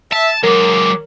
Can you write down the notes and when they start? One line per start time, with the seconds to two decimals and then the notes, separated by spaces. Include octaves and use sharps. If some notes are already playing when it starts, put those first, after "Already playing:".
0.12 E5 A5
0.43 F#3 G#3 A#4 D6